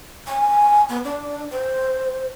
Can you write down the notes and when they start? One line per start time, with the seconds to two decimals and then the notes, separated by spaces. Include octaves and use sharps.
0.27 G#5
0.89 B3
1.04 D4
1.51 C5